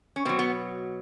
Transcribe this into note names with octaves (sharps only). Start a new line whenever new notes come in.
C#4
B2 F#3 C4
B3